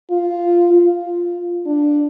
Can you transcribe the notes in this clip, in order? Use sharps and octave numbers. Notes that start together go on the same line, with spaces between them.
F4
F4
D4